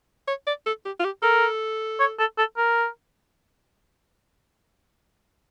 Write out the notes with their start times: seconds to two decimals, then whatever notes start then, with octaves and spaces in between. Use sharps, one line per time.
0.28 C#5
0.47 D5
0.66 A4
0.85 G4
0.99 F4
1.04 G4
1.23 A4 A#4
1.99 C#5
2.19 A4
2.38 A4
2.57 A#4